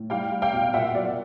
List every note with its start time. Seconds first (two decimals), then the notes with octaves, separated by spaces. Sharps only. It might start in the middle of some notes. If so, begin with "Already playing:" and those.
Already playing: A2
0.10 G3 F5 G5
0.31 G3
0.42 F5 G5
0.53 B2
0.74 A#2 E5 F#5
0.95 F#3 D5